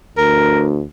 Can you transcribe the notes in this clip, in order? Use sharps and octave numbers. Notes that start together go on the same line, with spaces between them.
D2 A#4